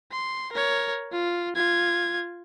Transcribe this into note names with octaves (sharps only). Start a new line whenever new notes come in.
C6
A#4 C#5
F4
F4 G#6